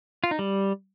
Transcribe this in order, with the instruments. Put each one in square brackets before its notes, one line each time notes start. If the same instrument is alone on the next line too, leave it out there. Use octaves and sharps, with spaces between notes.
[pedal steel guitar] F4
D#4
G3